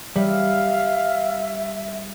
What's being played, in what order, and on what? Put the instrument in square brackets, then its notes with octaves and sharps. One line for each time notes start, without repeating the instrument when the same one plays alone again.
[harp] G3 [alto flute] E5 [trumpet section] F5